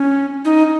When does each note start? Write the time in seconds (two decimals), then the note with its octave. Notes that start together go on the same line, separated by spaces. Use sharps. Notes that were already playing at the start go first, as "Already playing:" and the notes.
Already playing: C#4
0.45 D#4